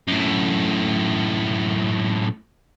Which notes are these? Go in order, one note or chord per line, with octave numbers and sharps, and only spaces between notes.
F#2 A2